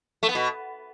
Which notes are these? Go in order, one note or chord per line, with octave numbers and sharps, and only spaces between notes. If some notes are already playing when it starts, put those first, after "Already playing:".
A3
B3
B2